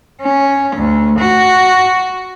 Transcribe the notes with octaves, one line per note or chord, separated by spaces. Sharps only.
C#4
D2
F#4